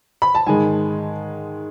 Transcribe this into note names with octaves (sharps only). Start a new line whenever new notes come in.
B5
A5
G#2 D#3 G#3 G#5